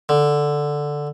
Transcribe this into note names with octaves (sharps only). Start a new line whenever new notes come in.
D3